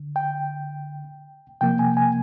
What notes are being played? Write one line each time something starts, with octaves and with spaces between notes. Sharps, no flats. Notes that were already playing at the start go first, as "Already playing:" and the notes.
Already playing: D3
G5
C3 F3 A#3 G5
G#5
G#5